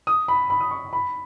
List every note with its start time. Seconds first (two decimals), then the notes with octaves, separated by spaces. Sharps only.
0.07 D#6
0.28 B5
0.50 B5
0.60 D#6
0.71 C#6
0.93 B5